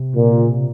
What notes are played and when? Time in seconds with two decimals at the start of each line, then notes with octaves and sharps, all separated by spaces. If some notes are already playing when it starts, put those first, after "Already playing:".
Already playing: C3
0.15 A#2
0.38 C#3
0.49 C3